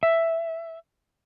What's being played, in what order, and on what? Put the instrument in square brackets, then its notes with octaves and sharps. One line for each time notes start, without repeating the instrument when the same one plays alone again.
[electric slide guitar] E5